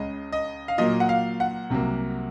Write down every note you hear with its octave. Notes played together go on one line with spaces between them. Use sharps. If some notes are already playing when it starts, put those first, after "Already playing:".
Already playing: C#2 C#3 G#3 D#5
D#5
F5
A#2 F#3 A#3 D#5
F#5
F5
F#5
C2 C3 F#3 A#3